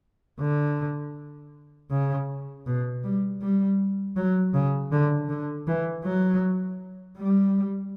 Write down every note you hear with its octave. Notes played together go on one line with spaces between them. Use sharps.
D3
C#3
B2
G3
G3
F#3
C#3
D3
D3
E3
F#3
G3